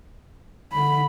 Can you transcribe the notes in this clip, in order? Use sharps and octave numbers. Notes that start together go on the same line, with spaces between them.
D3 B5